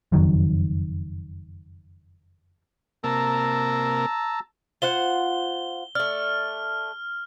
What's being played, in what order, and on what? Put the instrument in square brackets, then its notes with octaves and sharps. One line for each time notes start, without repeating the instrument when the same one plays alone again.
[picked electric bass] F#1 F2 D#3 F#3
[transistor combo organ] C3 A#3 A#4 [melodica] A5 A#5 E6
[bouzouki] F4 C5 F#5 [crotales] G7
[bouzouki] A3 D5 [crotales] F6